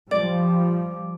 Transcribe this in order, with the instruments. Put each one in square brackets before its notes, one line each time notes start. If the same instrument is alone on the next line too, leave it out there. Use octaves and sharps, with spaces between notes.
[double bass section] F3 G3 [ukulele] D5 [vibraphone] D6